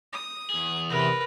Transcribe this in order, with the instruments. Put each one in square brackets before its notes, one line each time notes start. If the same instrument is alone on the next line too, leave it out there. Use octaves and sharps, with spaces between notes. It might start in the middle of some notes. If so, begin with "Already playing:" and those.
[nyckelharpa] D#6
[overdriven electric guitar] E2 G#4
[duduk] C3 [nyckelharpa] A#4 B4